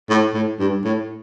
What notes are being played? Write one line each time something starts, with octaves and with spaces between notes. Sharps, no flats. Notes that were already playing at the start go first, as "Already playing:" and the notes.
A2
A2
G2
A2